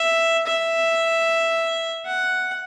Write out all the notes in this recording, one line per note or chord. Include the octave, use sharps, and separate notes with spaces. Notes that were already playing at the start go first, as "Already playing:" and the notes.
Already playing: E5
E5
F#5